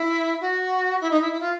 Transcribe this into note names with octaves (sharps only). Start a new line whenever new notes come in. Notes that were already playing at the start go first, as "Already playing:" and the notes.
Already playing: E4
F#4
E4
D#4
E4
E4
F4